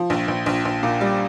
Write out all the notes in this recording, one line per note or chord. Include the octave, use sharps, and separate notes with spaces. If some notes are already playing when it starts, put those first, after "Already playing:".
Already playing: F3
A#1
A#1
A#1
A#1
A#2
G3